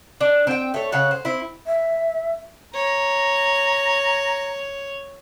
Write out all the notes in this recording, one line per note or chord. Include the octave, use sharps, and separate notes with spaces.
D4
C4 G5
A3 C#5
C#3 C#5 F#5
C5
C4 E4
E5
C#5 A#5